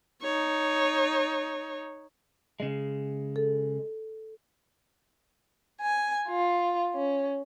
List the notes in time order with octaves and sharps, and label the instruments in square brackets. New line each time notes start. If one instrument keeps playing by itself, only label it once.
[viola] D#4 C#5
[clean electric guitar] C#3 G#3
[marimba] A4
[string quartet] G#5
F4
C#4